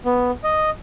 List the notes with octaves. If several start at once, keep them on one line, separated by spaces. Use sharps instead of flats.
B3
D#5